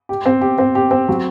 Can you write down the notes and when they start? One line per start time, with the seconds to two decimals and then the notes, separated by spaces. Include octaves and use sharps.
0.09 G4
0.26 C4
0.41 G4
0.58 C4
0.75 G4
0.91 C4
1.09 F#3